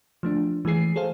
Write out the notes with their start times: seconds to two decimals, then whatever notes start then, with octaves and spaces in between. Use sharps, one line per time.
0.23 F3 A3 D4
0.65 E3 G#3 A3 G#4 C7
0.96 G#4 A4 C5 F5